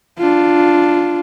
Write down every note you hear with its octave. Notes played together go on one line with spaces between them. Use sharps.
D4 F4